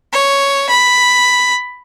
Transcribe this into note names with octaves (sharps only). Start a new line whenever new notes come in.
C#5
B5